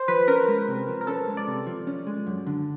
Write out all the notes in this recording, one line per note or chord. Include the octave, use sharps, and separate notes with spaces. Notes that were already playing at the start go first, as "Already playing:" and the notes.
Already playing: C5
F3 B4
C#4 A#4
G#3
C3
F3
A#4
C#4 A4
G#3
D5
C3
F3
C#4
G#3
F#2
D3